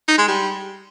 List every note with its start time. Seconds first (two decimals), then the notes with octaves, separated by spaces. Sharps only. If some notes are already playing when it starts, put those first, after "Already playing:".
0.08 D#4
0.18 G#3
0.28 G3